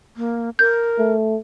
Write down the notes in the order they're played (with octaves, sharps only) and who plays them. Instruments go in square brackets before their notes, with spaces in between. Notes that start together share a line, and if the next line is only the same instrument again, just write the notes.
[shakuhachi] A#3
[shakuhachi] A#4 [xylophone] G6
[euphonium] A3